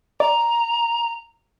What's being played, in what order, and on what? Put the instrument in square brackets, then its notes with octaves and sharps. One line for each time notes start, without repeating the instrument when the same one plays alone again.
[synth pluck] D5 [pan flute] A#5